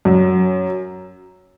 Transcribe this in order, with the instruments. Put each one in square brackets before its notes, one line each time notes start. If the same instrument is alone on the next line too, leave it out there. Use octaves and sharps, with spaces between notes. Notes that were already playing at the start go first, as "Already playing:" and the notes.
[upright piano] F#2